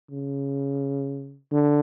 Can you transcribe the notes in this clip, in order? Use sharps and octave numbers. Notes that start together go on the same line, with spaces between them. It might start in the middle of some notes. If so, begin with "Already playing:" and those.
C#3
D3